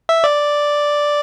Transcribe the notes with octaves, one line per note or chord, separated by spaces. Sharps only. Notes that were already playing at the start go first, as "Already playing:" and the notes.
E5
D5